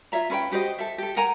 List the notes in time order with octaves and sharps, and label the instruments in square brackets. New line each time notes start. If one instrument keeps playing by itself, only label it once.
[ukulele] F4 C#5 E5 A#5
C#4 B4 C5 G5
F#4 G4 C5 D#5
A4 E5
G4 A4
A#4 F#5 G#5 A#5